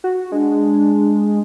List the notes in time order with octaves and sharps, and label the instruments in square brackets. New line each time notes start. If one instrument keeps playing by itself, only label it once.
[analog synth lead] F#4
[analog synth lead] G#3 [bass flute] D4